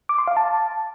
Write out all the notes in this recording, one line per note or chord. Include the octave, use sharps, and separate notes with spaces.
D6
C6
F5
A5